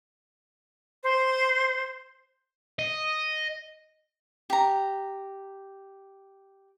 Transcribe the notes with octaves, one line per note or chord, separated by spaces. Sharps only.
C5
D#5
G4 A#5